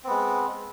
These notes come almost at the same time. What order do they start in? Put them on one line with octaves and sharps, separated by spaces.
C4 B3 G#3